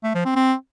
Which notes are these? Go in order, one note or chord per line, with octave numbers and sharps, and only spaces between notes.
A3
F3
C4
C4